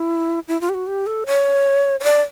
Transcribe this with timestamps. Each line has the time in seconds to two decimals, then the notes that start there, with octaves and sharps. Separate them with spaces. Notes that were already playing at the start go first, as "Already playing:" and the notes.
Already playing: E4
0.48 E4
0.61 F4
0.69 G4
0.74 F#4
0.87 G4
1.06 A4
1.26 C#5
2.00 C#5
2.04 D5